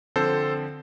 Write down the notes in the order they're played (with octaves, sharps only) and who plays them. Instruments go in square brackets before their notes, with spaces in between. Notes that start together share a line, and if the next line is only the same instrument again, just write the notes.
[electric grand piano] D3 F3 C4 A4 C5